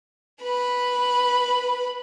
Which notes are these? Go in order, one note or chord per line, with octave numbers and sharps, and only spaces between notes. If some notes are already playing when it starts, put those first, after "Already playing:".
B4 B5